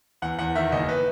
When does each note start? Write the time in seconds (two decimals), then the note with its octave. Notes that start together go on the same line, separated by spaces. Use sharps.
0.22 E2 F#5
0.39 E2 F#5
0.55 D#3 E5
0.72 F#1 D#5
0.89 B4